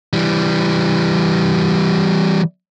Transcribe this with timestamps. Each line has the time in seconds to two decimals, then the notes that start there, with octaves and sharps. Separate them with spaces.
0.13 E3 G3